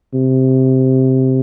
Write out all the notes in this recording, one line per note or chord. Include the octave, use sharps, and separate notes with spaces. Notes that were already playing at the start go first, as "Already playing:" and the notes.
C3